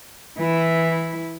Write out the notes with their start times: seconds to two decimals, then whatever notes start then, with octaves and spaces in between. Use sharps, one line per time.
0.38 E3 E4